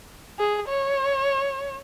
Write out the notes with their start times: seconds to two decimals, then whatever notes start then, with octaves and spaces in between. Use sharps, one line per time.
0.39 G#4
0.68 C#5